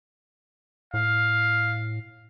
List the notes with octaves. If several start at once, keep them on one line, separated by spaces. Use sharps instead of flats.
A2 F5